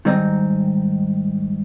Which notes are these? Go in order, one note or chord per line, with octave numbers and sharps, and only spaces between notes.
G#2 D#3 G3 C4 D#4